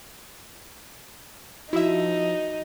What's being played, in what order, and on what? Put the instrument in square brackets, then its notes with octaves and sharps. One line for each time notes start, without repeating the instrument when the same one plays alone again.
[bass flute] F3 [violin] D#4 [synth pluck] E4 E5 [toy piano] F#4 E6